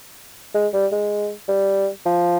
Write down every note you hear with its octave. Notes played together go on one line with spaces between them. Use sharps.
G#3
G3
G#3
G3
F3